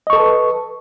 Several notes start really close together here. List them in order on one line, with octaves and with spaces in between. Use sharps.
D#5 C#6 A4 A5 B4